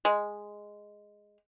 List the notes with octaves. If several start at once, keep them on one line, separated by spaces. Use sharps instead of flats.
G#3